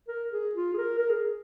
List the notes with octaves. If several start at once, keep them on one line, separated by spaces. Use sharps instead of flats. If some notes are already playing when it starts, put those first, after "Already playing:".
A#4
G#4
F4
G#4
A#4
A#4
G#4